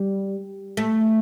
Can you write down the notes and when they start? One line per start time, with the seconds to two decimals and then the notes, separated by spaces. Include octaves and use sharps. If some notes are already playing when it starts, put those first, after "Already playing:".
Already playing: G3
0.77 A3